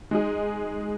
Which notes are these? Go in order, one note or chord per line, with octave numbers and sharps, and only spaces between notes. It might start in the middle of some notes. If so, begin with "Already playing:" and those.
G#3 D#4 G#4